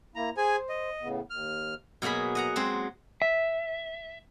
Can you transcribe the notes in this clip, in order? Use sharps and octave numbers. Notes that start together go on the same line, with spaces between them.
A#3 E4 A#5
G#4 C5 G#5
D#5
A2 C#3 B3
D#2 F6
B2 F#3 A#3 G#4 B5
D#5 F#5 A#5
F#3 G#3 C4 C5
E5